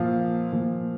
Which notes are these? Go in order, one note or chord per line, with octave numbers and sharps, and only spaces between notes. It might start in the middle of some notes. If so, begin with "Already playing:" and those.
Already playing: A#2 F3 F5
A#2 F3